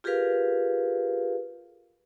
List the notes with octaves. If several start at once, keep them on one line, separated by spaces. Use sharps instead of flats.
F4 G4 G#4 A#4 B4 F5